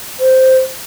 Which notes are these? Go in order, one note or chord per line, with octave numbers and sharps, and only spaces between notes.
C5